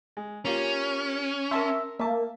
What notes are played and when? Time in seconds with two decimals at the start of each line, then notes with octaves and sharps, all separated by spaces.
0.17 G#3
0.45 A#3 C#4 F4 G4
1.51 A#4 E5 A5 C6
1.99 A#3 E5 A5